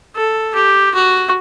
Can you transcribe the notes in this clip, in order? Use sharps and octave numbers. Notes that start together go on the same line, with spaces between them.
A4
G4
F#4